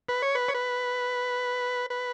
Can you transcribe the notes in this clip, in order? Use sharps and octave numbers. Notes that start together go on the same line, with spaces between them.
B4
C#5
B4
C#5
B4
B4